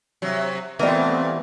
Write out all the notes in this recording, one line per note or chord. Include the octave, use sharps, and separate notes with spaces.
C3 F#3
A#2 E3 G3 A3 B3 C4 A#4